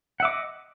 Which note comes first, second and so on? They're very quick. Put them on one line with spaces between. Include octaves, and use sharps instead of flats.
F#5 E5 D6 D#5